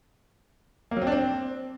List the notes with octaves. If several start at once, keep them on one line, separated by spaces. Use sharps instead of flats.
A#3
F#3
C4
D4
C4